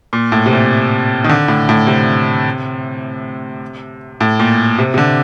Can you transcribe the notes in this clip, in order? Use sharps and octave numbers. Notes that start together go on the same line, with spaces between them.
A#2
A2
C3
A#2
D#3
D3
A2
A2
C3
A2
A#2
C3
C3
D3